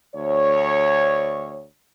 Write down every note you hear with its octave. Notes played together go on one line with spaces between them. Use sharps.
D2 C#5